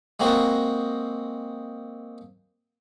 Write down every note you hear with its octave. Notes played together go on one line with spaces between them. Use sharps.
G#3 A#3 C4 F#4